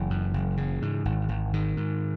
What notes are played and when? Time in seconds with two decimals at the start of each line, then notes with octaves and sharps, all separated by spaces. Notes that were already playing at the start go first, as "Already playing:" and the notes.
Already playing: F#1 E3
0.10 F#2
0.34 F#1
0.57 C#3
0.82 G#2
1.05 G#1
1.29 G#1
1.53 G#2 D#3
1.77 G#2